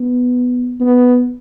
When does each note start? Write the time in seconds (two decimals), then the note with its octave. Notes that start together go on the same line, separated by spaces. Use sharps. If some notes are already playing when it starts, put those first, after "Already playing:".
Already playing: B3
0.80 B3